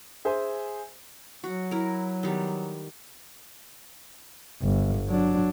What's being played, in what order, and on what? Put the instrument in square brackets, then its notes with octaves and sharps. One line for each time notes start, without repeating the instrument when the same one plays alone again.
[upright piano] G#4 C5 E5 G#5
[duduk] F#3 [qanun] F#4
[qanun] E4 A#4
D#3 G3 B3
[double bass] G1
F#3 D4